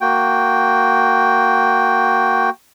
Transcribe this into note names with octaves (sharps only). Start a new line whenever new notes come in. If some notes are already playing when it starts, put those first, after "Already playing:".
A#3 F#4 G5